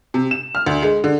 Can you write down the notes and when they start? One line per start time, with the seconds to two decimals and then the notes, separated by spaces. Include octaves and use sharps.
0.14 C3
0.31 E7
0.55 F6
0.66 D2
0.83 G#3
1.04 D3